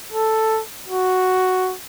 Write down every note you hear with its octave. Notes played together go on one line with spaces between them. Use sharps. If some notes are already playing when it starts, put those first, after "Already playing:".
A4
F#4